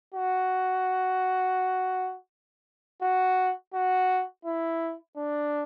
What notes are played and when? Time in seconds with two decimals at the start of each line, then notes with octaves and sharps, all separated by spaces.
0.15 F#4
3.02 F#4
3.74 F#4
4.45 E4
5.17 D4